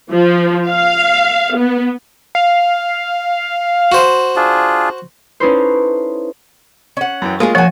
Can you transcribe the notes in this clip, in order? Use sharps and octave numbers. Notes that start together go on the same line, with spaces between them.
F3
F5
B3
F5
F#4 C5
D4 F4 G#4
C#4 D#4 E4 A4 B4 C5
C#4 F#5
F#2 E3 G5
G#3 A#3 C#4 F4 G#4
F3 F#4 C#5 F#5 G#5